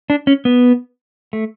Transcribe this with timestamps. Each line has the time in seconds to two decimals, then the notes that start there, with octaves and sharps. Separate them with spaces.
0.10 D4
0.27 C#4
0.45 B3
1.33 A3